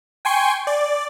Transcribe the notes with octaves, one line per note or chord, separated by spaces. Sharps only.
G5 G#5 C6 C#6
D5